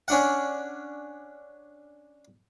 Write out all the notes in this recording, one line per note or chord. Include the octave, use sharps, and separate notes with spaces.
C#4 D4 F#5